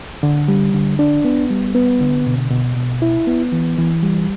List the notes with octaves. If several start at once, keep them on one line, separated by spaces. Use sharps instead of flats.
D3
G3
D3
D4
B3
G3
B3
D3
B2
B2
B2
E4
B3
E3
E3
G3